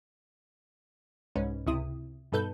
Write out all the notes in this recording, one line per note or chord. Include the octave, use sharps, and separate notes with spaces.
C2 G#2 C#4 D#4 B4
C#2 C3 E4 D#6
G2 B2 D#4 A4 B4 G6